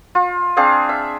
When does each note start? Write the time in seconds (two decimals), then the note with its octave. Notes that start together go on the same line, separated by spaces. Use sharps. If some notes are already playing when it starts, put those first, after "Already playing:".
0.15 F4
0.57 C4 D4 G#4 F5
0.89 E5